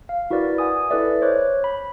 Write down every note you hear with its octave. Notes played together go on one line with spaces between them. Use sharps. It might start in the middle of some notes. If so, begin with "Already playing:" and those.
F5
E4 F#4 A#4 B4 D5
F#5 G#5 D#6
E4 A4 B4 D5 E5
C5 C#5 D6 F#6
B5